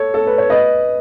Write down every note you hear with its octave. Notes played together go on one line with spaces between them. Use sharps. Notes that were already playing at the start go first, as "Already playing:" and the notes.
Already playing: A4 C#5
A4
B4
C#5
B4 D#5